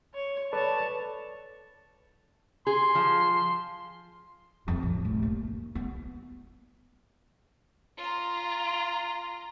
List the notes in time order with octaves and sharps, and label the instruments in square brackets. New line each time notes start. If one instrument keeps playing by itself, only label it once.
[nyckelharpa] C#5
[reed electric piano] A4 B4 D5 [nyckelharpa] C#5 A5
[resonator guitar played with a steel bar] G#4 [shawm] C6
[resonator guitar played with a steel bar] F3
[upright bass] F2
A1
F1
A#3
B3
[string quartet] F4 A#5